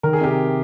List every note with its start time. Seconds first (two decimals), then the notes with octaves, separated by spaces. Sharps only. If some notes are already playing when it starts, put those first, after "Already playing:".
0.03 D#3 A#4
0.13 G#4
0.21 C3 G4 A#4